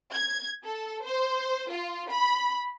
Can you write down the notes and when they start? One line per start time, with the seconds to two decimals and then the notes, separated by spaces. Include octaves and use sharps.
0.13 G#6
0.64 A4
1.03 C5
1.71 F4
2.09 B5